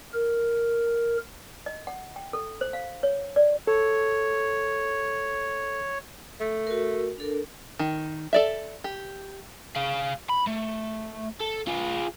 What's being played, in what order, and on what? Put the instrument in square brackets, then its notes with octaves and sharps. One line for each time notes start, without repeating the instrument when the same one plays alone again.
[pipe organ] A#4
[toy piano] D#5
F#5
G5
A4
C5
F5
C#5
D5
[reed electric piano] A4 [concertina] C#5
[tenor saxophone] A3
[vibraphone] F#4 A#4
D4 A4 A#4
[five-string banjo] D#3
A4 D5 E5
G4
[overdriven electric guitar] G#4 F5
B5
A3
A4
F4 G#4